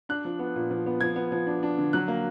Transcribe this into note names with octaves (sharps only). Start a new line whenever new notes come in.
D4 F#6
F3
B3
A#2
F3
B3
F3 G#6
B3
F3
D4
D4
D3
F#3 F#6
A#3